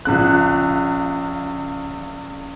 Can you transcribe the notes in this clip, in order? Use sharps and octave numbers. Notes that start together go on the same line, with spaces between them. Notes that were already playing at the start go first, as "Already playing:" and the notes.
A#1 C#3 F#6